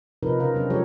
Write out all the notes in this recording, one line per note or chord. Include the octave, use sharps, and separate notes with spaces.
C3 F3 D#4 A#4 B4
C#3 F4 A#4
C3 F#3 C4 D4
F3 F#3 G#3 G4 A4 C#5